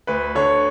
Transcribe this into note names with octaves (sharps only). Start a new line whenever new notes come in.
D2 B4
D3 C#5